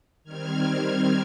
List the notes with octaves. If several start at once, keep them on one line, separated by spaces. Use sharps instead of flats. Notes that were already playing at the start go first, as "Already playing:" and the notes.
D#3 G3 C4 F6 G#6